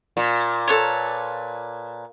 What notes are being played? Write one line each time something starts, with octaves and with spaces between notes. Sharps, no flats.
A#2
A4 B4 C#5